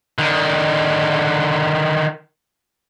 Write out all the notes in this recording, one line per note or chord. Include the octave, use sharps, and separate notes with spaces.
D3 D#3